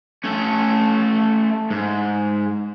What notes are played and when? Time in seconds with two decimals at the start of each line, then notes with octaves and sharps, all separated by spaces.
0.24 A3 C#4
1.70 G#2